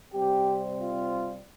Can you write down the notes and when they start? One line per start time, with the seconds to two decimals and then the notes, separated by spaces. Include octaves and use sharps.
0.13 C3 G3 C4 G4
0.80 F4